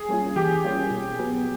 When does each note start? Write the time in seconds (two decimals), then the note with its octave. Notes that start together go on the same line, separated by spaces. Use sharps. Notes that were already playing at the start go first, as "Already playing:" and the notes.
Already playing: G#4
0.09 G3 A#3 C#4 F4
0.36 E3 G4
0.64 G3 A#3 C#4 F4
0.91 B2
1.19 F#3 B3